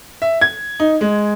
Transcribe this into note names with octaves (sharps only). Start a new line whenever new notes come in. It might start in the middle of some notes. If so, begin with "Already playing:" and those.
E5
G#6
D#4
G#3